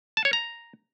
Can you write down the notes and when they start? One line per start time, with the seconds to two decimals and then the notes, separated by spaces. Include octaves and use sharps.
0.17 A5
0.25 C#5
0.33 A#5